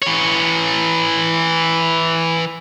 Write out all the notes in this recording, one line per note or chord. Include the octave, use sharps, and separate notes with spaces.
E3 C#5